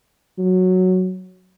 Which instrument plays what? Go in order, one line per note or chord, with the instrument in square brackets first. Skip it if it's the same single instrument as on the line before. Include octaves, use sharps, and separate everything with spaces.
[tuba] F#3